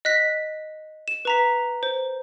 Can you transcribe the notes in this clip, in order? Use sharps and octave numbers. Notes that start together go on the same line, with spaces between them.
D#5 F#6 B6
E7
B4 A#5 B6
C5